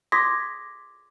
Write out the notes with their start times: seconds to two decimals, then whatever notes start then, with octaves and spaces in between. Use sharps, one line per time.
0.12 C6 D6 D#6 G#6 A#6 B6